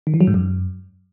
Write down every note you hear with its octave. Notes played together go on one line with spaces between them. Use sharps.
D#3
E3
F#3
G#2
F#2